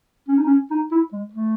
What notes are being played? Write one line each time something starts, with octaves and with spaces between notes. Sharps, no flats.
C#4
D#4
C#4
D#4
E4
G#3
A3